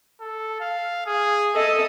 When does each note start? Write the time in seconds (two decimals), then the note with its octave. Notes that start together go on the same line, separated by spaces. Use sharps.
0.21 A4
0.60 F5
1.06 G#4
1.55 A4 D#5 E5